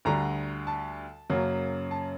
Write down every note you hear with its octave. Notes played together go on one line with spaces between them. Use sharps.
D2 D3 G3 A#5
A5
F#2 C#3 F#3 A#3
A5